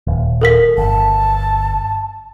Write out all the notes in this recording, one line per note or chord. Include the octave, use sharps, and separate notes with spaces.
D#1
A4 A#4 B6
G1 A5